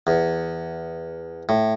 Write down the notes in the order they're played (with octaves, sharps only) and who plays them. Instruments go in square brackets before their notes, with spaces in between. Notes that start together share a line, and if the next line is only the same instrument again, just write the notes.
[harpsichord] E2
A2